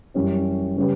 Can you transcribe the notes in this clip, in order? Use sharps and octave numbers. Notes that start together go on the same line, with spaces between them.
F#2 E3 G3 C#4 G4
C#3 G3 C#4 G4 B4